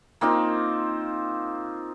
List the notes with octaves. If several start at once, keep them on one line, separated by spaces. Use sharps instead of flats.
A#3 C4 D#4 F4